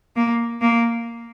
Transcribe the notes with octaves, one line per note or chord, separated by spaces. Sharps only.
A#3
A#3